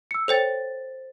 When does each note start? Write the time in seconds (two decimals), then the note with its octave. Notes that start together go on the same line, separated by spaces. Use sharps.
0.11 E6 C#7
0.28 A4 C5 C#5 G5 A6